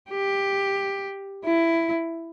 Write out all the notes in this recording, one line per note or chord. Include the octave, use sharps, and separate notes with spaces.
G4
E4